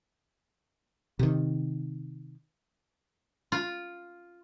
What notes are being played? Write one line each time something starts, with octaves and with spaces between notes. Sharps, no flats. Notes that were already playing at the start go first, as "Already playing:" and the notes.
C3 D#3
F4